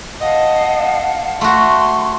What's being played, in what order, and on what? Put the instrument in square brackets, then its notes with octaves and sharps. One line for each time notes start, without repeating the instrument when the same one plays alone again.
[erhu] D#5 [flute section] F5 F#5 A5
[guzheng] A3 F#4 [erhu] C6